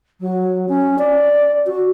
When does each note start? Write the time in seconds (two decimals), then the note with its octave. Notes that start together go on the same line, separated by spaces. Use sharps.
0.21 F#3
0.69 C#4
0.98 D5
1.66 F#4